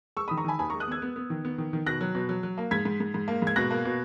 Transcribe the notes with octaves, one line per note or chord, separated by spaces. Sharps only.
G#3 C#6 E6
B5 D#6
D#3
A#5 C#6
D#3 G#5 B5
D#2 G#5 B5
A#5 C#6
G#3
D#6 F#6
B3 E6 G#6
B3
B3
D#3
B3
D#3
D#3
B2 F#6 A#6
F#3
B2
F#3
F#3
A#3
G#2 G#6 B6
G#2
G#2
G#2
A#3
G#2 G#6
B2 F#6 A#6
A#3
B2